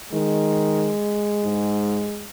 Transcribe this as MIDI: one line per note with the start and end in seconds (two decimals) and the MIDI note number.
0.13 0.92 51
0.13 2.27 56
1.44 2.06 44